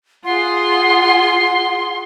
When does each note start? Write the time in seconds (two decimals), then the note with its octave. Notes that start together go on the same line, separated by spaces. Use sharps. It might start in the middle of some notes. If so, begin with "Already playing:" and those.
0.25 F4 G#4 F#5 C6